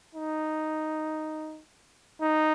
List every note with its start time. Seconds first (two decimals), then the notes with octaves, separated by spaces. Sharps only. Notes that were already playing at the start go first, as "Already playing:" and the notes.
0.15 D#4
2.22 D#4